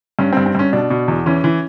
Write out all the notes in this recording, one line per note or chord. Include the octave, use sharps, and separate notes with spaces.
G2 C#4
G2 C4
C4
G2 C#4
B2 D4
B2
E2
E3 C#4
E3